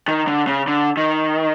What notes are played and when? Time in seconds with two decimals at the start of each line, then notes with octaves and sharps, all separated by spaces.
0.08 D#3
0.28 D3
0.47 C#3
0.68 D3
0.97 D#3